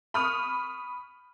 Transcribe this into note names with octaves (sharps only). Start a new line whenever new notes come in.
B5 C#6 D#6 F6